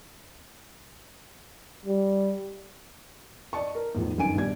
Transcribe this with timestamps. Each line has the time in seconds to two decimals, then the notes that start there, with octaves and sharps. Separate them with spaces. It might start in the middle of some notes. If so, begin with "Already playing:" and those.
1.86 G3
3.53 D5 D#5 A5 C#6
3.75 A#4
3.95 E2 A2 D#3 F3
4.17 G1 F#2 D#3 G#5 D7
4.35 A#1 B2 G3 G#6